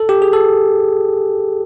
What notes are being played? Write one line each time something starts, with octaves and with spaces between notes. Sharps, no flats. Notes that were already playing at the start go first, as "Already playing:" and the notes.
Already playing: A4
G4
G#4
A4